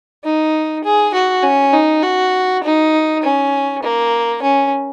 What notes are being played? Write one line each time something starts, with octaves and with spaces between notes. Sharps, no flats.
D#4
G#4
F#4
C#4
D#4
F#4
D#4
C#4
A#3
C#4